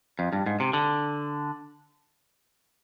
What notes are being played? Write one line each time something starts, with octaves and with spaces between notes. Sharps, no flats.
F2
G2
G#2
C3
D3